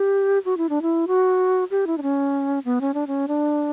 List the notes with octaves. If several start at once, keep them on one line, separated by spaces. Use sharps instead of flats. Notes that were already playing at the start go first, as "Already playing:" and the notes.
Already playing: G4
F#4
E4
D4
E4
F#4
G4
E4
D4
C#4
B3
C#4
D4
C#4
D4